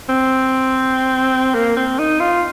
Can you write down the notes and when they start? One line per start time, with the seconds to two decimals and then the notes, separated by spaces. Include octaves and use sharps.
0.09 C4
1.55 A#3
1.77 C4
1.99 D#4
2.20 F4